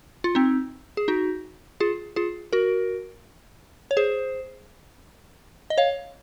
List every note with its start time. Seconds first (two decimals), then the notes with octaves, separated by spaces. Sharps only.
0.24 F4
0.35 C4 D#4
0.97 G#4
1.08 D#4 F#4
1.80 F4 G#4
2.16 F4 G#4
2.53 F#4 A#4
3.91 C#5
3.97 G#4 C5
5.70 D#5
5.78 C#5 F5